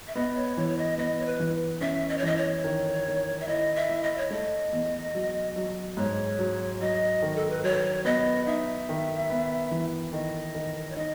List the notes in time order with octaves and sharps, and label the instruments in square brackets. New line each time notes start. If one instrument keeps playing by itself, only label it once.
[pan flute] E5
[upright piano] B3 [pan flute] D#5
[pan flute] C#5
[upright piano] E3 [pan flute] C#5
[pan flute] C#5
D#5
[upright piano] B3 [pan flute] D#5
[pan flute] C#5
B4
[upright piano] E3
[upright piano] C#4 [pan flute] E5
[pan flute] D#5
C#5
[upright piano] E3 [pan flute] D#5
[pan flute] C#5
[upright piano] D#3
D#3
[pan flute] E5
[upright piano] E4 [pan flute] D#5
[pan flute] E5
[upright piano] E4
[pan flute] D#5
C#5
[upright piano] A3 [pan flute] D#5
[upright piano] E2
F#3
F#3
[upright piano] G#2 [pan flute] C#5
[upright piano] F#3
[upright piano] F#3 [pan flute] D#5
[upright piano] D#3
[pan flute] A4
B4
[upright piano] F#3 [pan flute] C#5
[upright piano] B3 [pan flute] D#5
[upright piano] D#4 [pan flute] E5
[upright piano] D#3
B3
E3
[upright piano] D#3 [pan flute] D#5
[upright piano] D#3
[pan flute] C#5
[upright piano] D#4 [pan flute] D#5